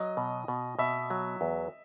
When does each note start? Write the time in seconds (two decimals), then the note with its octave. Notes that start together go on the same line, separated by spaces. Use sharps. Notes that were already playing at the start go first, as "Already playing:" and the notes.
Already playing: F#3 D#5
0.17 B2
0.48 B2
0.79 B2 E5
1.10 F#3
1.41 E2